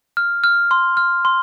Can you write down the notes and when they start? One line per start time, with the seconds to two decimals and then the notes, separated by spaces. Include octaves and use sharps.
0.17 F6
0.44 F6
0.71 C6
0.97 F6
1.25 C6